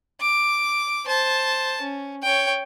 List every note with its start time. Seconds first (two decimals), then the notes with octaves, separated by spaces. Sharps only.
0.21 D6
1.06 C5 A5
1.82 C#4
2.23 C#5 G5